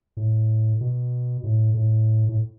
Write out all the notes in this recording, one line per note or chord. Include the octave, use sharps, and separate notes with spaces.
A2
B2
A2
A2
A2